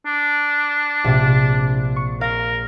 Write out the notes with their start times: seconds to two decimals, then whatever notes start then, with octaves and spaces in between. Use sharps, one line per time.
0.06 D4
1.04 A#1 C3
1.96 C#6
2.21 A#4 F5 A#6